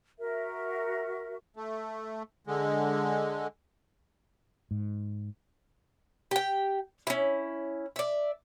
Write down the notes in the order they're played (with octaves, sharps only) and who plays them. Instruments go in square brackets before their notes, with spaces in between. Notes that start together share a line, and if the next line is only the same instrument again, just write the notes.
[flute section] F#4 A#4 E5
[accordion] A3
D3 G#3
[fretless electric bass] G#2
[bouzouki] G4 G5
C#4 E4
D5 E5